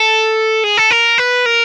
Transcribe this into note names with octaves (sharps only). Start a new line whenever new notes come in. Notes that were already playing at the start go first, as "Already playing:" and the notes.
Already playing: A4
G#4
A4
A#4
B4
A#4